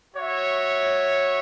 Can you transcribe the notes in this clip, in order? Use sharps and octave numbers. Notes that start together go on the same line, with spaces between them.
F#4 C#5 E5